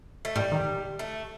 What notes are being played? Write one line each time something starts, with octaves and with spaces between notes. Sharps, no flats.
A3
A2 G3
D#3
A3